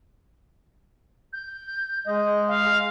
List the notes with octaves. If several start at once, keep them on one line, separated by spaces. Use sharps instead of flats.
G6
G#3 D#5
F5